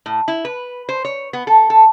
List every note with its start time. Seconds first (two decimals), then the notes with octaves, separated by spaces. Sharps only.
0.06 A2
0.28 E4
0.45 B4
0.89 C5
1.05 C#5
1.33 B3
1.47 A4
1.70 A4